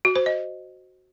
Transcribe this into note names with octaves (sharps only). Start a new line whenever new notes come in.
F#4
C5
D#5